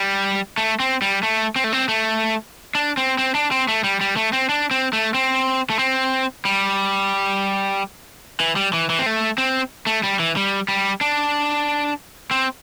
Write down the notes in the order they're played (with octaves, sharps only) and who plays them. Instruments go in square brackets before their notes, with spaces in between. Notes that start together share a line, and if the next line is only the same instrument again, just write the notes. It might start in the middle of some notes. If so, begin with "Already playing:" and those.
Already playing: [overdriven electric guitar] G3
A3
C4
G3
A3
C4
A3
C4
A3
D4
C4
C4
D4
C4
A3
G3
G3
A3
C4
D4
C4
A3
C4
A3
C4
G3
E3
G3
E3
E3
C4
A3
C4
A3
G3
E3
G3
G3
D4
C4